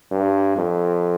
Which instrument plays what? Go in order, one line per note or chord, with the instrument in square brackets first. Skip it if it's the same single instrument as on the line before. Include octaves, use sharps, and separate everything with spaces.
[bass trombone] G2
F2